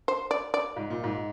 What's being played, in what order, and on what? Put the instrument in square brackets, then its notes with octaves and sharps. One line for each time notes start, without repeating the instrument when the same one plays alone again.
[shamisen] C5
D5
D5
[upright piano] G#2
A#2
G#2